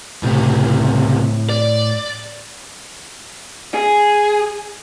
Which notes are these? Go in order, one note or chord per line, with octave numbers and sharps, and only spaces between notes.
C#2 A2 C3
D5
G#4